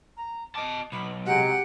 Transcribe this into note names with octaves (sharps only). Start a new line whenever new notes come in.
A#5
D#5 A5 D6
B1 B5
C3 F#3 G#3 G4 F#5